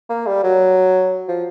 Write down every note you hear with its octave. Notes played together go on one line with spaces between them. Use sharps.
A#3
G3
F#3
F3